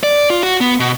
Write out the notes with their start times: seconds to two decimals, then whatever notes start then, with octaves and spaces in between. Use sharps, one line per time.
0.03 D5
0.30 F4
0.43 F#4
0.61 B3
0.80 B2